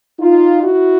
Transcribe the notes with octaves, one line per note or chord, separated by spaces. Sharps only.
D#4 F4
E4 F#4